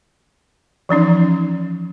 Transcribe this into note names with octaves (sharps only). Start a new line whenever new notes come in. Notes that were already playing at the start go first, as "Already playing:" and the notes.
E3 F3 C#4 D#4